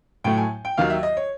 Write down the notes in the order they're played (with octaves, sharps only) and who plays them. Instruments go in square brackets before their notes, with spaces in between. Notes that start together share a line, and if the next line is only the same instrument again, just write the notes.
[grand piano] A2 F#3 A3 G5
G#5
G5
D#2 D#3 F#3 F5
E5
D#5
C#5